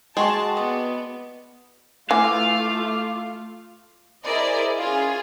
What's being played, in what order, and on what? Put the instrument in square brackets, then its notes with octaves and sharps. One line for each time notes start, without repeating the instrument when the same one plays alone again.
[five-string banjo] G#3 [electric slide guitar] F#4 F#5 G5 [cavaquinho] G#4 C6 C#6 [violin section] A5
[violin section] B3 [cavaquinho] D5 D#5
[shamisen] E3 [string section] A3 F4 [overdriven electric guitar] F5 [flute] D6
[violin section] E4 G#4 A#4 C5 D5 D#5
C#4 F4 G#4